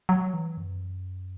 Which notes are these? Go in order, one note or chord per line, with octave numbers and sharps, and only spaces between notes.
F#3
E3
F#2